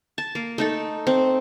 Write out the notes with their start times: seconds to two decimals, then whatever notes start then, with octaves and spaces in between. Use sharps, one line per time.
0.18 A5
0.35 A#3
0.58 A3 D#4 A4
1.07 C4